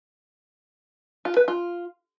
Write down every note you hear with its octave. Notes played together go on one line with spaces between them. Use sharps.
F4
B4
F4